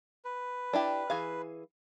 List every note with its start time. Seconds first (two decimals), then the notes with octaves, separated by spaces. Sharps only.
0.25 B4
0.73 D4 E4 G4
1.10 E3 G#4 F5